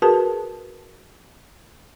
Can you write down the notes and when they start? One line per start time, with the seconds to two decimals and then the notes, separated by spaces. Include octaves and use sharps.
0.02 F#4 G#4 A#4 B4 A5